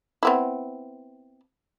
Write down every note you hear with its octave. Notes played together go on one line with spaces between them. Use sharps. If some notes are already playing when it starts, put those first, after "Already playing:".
B3 C4 E4